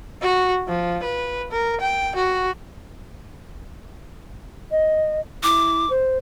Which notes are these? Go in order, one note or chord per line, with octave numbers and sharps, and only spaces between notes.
F#4
F3
B4
A#4
G5
F#4
D#5
E4 D6
C5